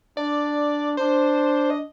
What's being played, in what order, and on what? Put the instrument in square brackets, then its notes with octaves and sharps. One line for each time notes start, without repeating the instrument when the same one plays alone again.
[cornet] D4 [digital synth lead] D5
[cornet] D4 [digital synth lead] C5
[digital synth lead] D#5